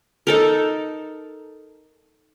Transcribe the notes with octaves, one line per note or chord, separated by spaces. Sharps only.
D#4 A4 A#4